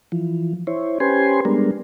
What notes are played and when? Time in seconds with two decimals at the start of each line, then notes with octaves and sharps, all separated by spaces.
0.12 E3 F3
0.67 E4 C5 C#5
1.00 C#4 G4 B4 C5 G#5 C6
1.45 G3 G#3 B3 D4 A#4